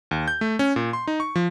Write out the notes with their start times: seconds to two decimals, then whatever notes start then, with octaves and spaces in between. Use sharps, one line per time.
0.11 D#2
0.28 G6
0.41 A3
0.59 C#4
0.76 A#2
0.93 C6
1.07 D#4
1.20 C#6
1.35 F3